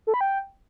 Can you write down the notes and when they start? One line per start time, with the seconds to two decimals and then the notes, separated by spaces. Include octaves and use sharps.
0.07 A4
0.14 B5
0.21 G5